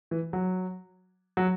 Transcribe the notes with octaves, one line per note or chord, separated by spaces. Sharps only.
E3
F#3
F#3